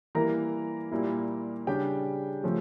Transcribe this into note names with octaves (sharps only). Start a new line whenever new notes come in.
E3 G3 A#3 E4 A#4 A#5
A#2 G3 A#3 E4
C#3 G3 D4 G4 G5
C#3 F3 A3